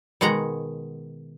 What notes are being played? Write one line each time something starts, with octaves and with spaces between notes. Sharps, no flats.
B2 D#3 G#3 F#5 A#5